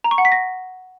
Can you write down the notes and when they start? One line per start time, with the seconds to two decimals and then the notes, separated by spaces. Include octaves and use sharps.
0.04 A#5
0.11 C#6
0.18 F#5
0.25 B6
0.32 A#6